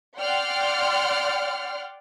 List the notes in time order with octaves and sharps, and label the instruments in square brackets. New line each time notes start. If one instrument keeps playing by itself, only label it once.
[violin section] D5 F#5 G5 C6 F6